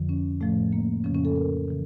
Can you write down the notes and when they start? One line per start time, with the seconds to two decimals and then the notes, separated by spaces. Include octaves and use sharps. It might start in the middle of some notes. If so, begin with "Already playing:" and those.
Already playing: F2 D3 F3
0.09 C#4
0.41 A2 F3 A3
0.73 A#3
1.04 F2 C#3 F3 C#4
1.14 C#4
1.25 A4
1.36 A#4
1.68 C#3 E3